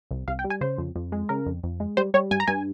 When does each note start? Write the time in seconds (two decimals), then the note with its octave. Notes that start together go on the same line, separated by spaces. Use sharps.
0.11 C2
0.28 C2 F5
0.39 G5
0.44 G3
0.50 G#5
0.61 C#3 C5
0.78 F2
0.96 F2
1.12 G#3
1.29 C#3 A#4
1.46 F2
1.64 F2
1.80 G#3
1.97 G3 C5
2.14 G3 C#5
2.31 G2 G#5
2.40 A#5
2.47 G2 G#5